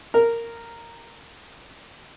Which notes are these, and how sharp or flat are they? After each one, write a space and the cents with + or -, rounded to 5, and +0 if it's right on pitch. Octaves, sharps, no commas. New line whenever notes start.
A#4 -10